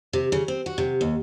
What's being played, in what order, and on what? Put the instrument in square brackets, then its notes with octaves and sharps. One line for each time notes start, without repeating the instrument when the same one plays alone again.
[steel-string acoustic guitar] C3
C#3
C4
F#4
C3
D#2